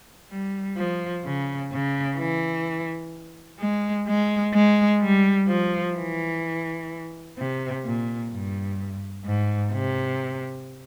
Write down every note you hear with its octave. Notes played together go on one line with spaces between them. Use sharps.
G3
F3
C#3
C#3
E3
G#3
G#3
G#3
G3
F3
E3
C3
A#2
G2
G#2
C3